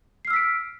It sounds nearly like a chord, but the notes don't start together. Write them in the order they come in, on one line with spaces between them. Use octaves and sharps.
C7 F6 E6 B6 D7